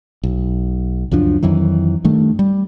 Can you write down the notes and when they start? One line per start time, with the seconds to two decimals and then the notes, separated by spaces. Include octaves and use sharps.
0.23 B1
1.11 C#2 F#2 F3 D4
1.43 F2 D#3 E3 F#3
2.04 G2 D#3 A3
2.39 G3